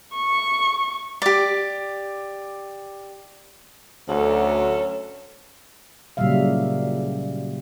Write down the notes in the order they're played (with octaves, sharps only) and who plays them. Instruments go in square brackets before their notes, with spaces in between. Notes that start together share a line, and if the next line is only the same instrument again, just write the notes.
[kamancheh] C#6
[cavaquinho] G4 D5
[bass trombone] D2 [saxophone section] F#3 C#4 A4
[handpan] A#2 C#3 F#3 G3 E5 F5